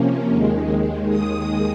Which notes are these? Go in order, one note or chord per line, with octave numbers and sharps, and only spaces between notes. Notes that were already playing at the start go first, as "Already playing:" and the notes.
Already playing: C3 F3 A#3 C#4
D#2 D#3 G#3
D#6